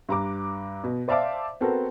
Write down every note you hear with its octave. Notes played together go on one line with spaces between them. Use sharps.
G2 A#5 D6
B2
C5 D5 E5 F5 A5 D6
B3 C4 F#4 A4 A#4